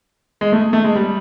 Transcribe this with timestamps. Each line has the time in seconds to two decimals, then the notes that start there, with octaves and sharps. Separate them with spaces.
0.41 G#3
0.52 A3
0.73 A3
0.84 G#3
0.96 G3